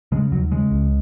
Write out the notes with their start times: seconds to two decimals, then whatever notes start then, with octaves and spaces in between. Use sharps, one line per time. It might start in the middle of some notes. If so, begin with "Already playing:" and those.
0.12 C#3 G#3
0.32 D#2 F#3
0.51 C#3 G#3
0.71 C#2